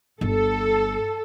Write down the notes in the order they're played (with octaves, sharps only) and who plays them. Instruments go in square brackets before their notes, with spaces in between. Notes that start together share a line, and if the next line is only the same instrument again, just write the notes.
[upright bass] G1 [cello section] A4